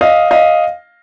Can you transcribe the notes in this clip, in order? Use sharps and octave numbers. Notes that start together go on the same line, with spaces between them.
D#5 F5
D#5 F5